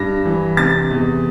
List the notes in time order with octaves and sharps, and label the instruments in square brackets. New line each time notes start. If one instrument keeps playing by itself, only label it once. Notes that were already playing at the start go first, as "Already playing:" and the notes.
Already playing: [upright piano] G2 A#6
E3
C3 A6
E2